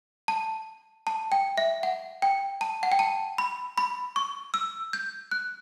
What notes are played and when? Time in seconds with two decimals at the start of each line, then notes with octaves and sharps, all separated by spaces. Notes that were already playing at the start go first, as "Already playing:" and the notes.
0.28 A5
1.07 A5
1.32 G5
1.58 E5
1.83 F#5
2.22 G5
2.61 A5
2.83 F#5
2.92 G5
2.99 A5
3.38 B5
3.78 B5
4.16 C#6
4.54 E6
4.93 G6
5.31 F#6